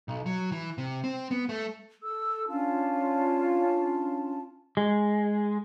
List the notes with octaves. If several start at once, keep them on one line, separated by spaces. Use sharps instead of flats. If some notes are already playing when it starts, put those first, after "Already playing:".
B1
F#3
E3
C3
C4
B3
A3
A4 E6
C#4 D4 F4 A5
G#3